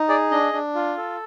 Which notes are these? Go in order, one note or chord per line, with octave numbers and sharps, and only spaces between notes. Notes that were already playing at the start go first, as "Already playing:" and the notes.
Already playing: D#4
G#4 D5
D4 D#5
D4
F4
A4